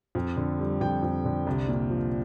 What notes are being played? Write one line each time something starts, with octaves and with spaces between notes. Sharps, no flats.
F2
D3
G3
F2 G5
F2
D3
C2
A#2
F3